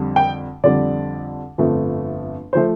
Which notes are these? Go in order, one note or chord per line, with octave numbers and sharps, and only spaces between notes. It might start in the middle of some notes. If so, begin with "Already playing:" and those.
Already playing: F2 D3 G3
G5
F2 D3 G3 D5
G1 F2 F3 A3
F3 A3 C5